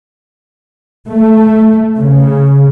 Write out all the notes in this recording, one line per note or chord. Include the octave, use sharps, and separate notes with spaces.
A3
C#3